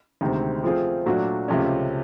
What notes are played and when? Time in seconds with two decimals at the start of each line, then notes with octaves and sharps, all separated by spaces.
0.21 D2 C3 D#3 G#3 C4
0.64 F3 A3 C4 F4 G#4
1.06 A#2 F#3 A3 D4 F#4
1.48 C#2 C3 F3 A3 C#4